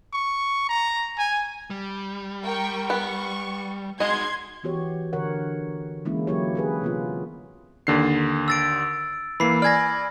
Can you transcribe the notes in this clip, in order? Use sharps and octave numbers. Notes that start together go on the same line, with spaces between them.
C#6
A#5
G#5
G3
A#4 G5 C#6
B3 C#6
G#3 D#4 F#4 D#5 C6 G#6
E3 B3 F#4 G4 C#5
D3 A#4 C#5 F#5
E3 G#3 A#3 C#4 E4
D3 F#3 A#3 E4 G4 C#5
G4 G#4 B4
C3 B3 F4
D#2 D3 C7
E6 A6 D7
E3 A#3 B5 C7
D5 G#5 F6 G#6 A#6